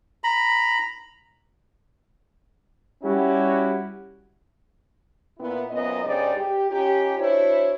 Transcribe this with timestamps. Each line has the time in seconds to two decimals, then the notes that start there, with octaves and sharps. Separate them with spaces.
0.24 A#5 B5
3.04 G3 C#4 E4 F#4 G4
5.38 A#2 B3 E4
5.70 F#2 A#2 B3 C4 D#5
6.04 G2 C#3 G#3 D#4 C5 D5
6.36 G4
6.70 C#4 D#4 F4 G4
7.18 D4 E4 F#4 C5 C#5